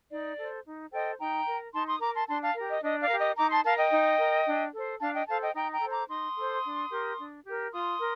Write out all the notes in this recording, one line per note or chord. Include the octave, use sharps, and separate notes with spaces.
D#4 D5
A4 C5
D#4
A4 C5 D#5 G5
D#4 G5 A#5
A#4
D#4 A5 C6
C6 D#6
A#4 A#5 D6
A5 C6
D4 A5 C6
F5 A5
G4 A#4
D#5
D4 D#5
D5 F5
G4 A#4
D#5
D#4 A#5 D6
A5 C6
A#4 F5 A5
D#5 G5
D#4
A#4
D4
A4 C5
D4 F5 A5
D#5 G5
A4 C5 F5 A5
D#5 G5
D#4 G5 A#5
G5 A#5
A4 C5
A#5 D6
D#4 C6 D#6
A4 C5
D4
G4 A#4
D4
G4 A#4
F4 C6 D#6
A#4